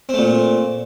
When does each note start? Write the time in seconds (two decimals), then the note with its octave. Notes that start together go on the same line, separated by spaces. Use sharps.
0.09 C4
0.14 A3
0.18 A#2